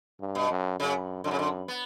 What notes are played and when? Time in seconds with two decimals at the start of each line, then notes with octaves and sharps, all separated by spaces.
0.20 G2
0.35 B2
0.50 F#2
0.80 F#2 C#3
1.24 F#2 D3
1.31 C#3
1.39 D3
1.68 B3